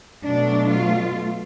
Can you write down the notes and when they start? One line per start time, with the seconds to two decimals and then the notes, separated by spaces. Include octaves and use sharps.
0.24 B2 F#3 A3 D4
0.72 F4